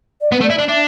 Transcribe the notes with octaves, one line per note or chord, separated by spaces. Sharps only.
D5
B3 B4
A3
D5
E4
D4 D5
D4 E5